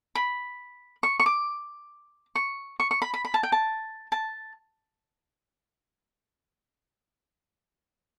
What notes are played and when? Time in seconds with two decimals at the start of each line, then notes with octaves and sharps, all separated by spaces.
0.15 B5
1.03 C#6
1.20 C#6
1.26 D6
2.35 C#6
2.80 C#6
2.91 C#6
3.02 B5
3.14 B5
3.25 B5
3.34 A5
3.43 G5
3.52 A5
4.12 A5